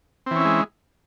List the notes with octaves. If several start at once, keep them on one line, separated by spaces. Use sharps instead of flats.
E3 G#3 C4 C#4 E4